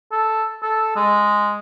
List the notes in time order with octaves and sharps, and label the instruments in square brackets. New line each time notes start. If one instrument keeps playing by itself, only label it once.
[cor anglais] A4
A4
G#3